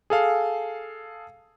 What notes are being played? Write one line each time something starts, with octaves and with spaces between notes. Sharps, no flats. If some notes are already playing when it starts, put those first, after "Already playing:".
G#4 A4 F5